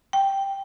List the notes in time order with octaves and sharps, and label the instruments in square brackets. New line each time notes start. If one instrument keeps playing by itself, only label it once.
[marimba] G5